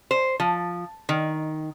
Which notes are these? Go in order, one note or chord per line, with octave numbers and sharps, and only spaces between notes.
C5
F3
D#3